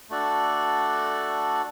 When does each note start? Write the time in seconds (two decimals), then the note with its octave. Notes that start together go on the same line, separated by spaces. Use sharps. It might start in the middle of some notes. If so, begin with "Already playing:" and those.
0.09 A3 D4 F#4 A4 D5